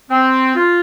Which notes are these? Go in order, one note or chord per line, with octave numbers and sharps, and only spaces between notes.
C4
F4